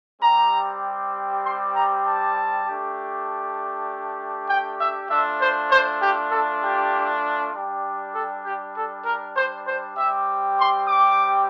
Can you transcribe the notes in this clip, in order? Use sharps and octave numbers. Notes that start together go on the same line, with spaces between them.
G3 C4 G4 A#5
C6
A#5
A5
A3 D4 G4
G5
E5
A3 D4 F4 E5
C5
C5
G4
A4
G4
G3 D4 G4
A4
G4
A4
A#4
C5
C5
G3 C4 G4 E5
C6
D6